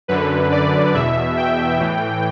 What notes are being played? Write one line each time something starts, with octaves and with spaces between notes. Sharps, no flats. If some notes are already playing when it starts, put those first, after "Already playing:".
F#2 D3 B4
D5
E2 B2 E5
G5
A2 E3